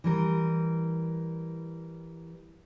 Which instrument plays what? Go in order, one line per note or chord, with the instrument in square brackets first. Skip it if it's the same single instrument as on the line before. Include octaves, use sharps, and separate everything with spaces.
[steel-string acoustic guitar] E3 G3 A#4